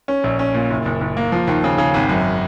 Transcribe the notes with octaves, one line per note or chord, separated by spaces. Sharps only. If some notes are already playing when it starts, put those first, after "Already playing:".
C#4
A#1
C#4
A#2
F#1
F#1
F#1
A#3
F3
D#2
C#3
C#3
G#1
F#2